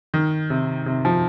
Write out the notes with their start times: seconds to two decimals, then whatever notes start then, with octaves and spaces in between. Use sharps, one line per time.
0.14 D#3
0.50 C3
0.86 C3
1.05 F3